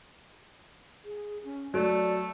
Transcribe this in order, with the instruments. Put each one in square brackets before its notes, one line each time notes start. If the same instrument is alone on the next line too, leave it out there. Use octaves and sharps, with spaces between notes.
[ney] G#4
C#4
[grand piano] F#3 [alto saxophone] A3 [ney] D5